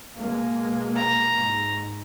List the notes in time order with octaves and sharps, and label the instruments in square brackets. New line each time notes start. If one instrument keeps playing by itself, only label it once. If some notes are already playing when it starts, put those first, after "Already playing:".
[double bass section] B2 G#3 A#3
[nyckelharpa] A#5
[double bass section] G#2